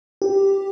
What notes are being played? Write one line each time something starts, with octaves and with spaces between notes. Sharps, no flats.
G4